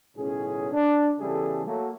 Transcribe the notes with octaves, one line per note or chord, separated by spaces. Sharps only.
B1 A2 C#3 C#4 G#4
D4
E2 C#3 G3 A3 G#4 A4
F#3 A3 A#3